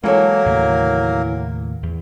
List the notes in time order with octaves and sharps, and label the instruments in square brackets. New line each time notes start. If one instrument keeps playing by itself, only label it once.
[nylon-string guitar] E3 A4 C#5 [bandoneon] F#3 A#3 A#4 [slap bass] G#3
[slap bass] D#2 A2 C#3
E2